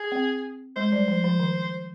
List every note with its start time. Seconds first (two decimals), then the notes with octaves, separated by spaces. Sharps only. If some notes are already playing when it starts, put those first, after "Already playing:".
Already playing: G#4
0.12 C4
0.76 G#3 C5
0.92 G3
1.08 F3
1.24 F3
1.40 D#3